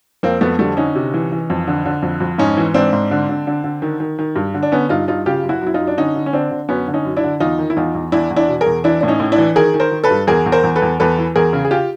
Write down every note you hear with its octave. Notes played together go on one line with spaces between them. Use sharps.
F2 A#3 C4
F2 A3 B3
D3 G3 A3
D3 C#4 D#4
C3
E3
E3
F2
D3
D3
F2
F2
G#2 C#4 D#4
E3
G#2 C4 D4
G#2
D3
D3
D3
D3
D#3
D#3
D#3
G2
D3
D4
D3 B3 C#4
G2 D#4 F4
G2 D#4 F4
C#3 F4 G4
F#2
E4 F#4
F#2
E4
D#4 F4
F#2
D4
D3 C#4 D#4
D3
C#4
D3 C4 D4
D3
F#2 B3 C#4
D3
C#4 D#4
F#2
D4 E4
D3
E2 D#4 F4
D#3
E4
E2 D#4 F4
E2
E2 D4 E4
E2
D4 E4
B2
G#4 A#4
E2
E3 D4 E4
A2 D4
C#4 D#4
A2
D4 E4
E3
D#3 G#4 A#4
D#3
A#4 C5
D#3
A4 B4
G2
E2 G#4 A#4
E2
A#4 C5
E2
A4 B4
E2
E2 A4 B4
E3
E2 G#4 A#4
C#3
G#4
F4 G4